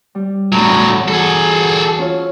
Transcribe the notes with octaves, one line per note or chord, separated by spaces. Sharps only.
G3
E2 A2 F#3 A5
E3 F#4 G#4 A4
C#4 F4 C#5